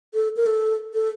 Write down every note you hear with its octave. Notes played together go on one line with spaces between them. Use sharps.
A4
A#4
A4
A4